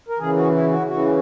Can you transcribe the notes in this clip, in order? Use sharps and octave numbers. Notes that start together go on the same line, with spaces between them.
A#4
C#3 E3 G#4
F#4
E4
F#4
C#3 E3 F#4